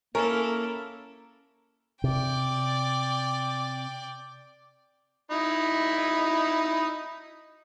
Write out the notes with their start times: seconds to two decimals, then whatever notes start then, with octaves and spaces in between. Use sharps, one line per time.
0.15 A#3 C#4 E4 A4 A#4
2.04 C3 D5 G5
5.31 D#4 E4 B5